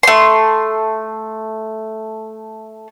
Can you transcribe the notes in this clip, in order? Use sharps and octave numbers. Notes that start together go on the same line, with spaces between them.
A3 C6